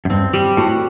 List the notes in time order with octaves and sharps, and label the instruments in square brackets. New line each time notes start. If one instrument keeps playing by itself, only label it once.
[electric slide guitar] F#2
[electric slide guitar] G2 [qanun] C4
[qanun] G3
[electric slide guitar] A2 [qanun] F#4